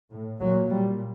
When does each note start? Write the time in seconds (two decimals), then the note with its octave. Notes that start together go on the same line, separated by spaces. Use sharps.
0.11 A2
0.41 A#2 F#3
0.69 A#2 G3